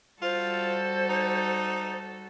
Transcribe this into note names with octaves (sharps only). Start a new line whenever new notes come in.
G3 F4 F#4 A4 C5
D#4